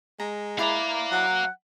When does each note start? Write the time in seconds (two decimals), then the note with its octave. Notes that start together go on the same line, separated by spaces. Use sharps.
0.20 G#3 A#5
0.58 E4 B4 D5 F5 A#5
1.12 F#3 F#5